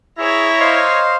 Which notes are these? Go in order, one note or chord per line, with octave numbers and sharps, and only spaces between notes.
E4 G#4 C#5 A#5
C5 D#5 F5 C6